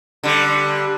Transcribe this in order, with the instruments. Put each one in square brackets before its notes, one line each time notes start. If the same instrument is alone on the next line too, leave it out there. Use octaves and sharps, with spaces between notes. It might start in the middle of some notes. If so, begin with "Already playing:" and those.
[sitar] D3 G3